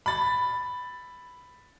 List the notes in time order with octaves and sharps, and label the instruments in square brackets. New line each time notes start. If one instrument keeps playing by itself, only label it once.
[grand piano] B5 A6